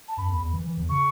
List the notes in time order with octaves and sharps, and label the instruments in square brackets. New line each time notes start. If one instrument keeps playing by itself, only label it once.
[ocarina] A5
[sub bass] F#2 [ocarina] B5
[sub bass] E2
E2
E3
E3
E2
[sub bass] C#3 [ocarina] C#6